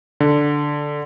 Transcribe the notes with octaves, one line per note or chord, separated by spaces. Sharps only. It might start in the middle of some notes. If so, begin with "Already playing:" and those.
D3